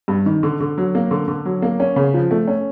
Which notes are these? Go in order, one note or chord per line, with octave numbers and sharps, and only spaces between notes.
G2
D#3
D3
D3
F#3
A#3
D3
D3
F#3
A#3
C#4
C#3
F3
A3
C#4